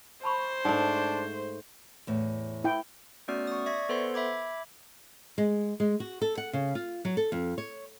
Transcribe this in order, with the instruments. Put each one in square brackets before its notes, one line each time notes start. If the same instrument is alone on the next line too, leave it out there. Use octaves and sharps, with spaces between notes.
[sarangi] C5 [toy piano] A5 B5 C#6
[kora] G#2 A3 [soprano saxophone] D4
[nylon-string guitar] E2 A2
[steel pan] E4 G5
[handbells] A3 B3 C#4 F#4 D5 F6
C#6 D#6
D5 E5 C#6 G#6 A#6
B3 A4 B4 C5 C6
E5 B5 D6 G#6
[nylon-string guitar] G#3
G#3
F#4
A4
F#5
C#3
F4
F#3
A4
F2
C#5